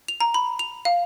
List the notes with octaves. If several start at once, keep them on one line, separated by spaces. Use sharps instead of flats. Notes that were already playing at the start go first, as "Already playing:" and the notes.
F7
A#5
B5
F7
F5